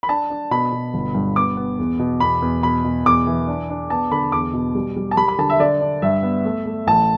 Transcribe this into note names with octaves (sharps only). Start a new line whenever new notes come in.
B5
D4 A5
D4
B2 B5
B2
G1
G2
B3 D6
B3
E2
B2
E2 B5
E2
B2 B5
B2
E2 D6
E3
D4
D4
B3 A5
D3 B5
E2 D6
B2
G3
G3
A5
G3 B5
B5
D3 A5
E5
D3 D5
D4
G2 E5
B3
A3
A3
A1 A5